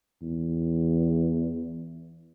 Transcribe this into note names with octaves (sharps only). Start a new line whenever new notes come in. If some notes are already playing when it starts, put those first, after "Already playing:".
E2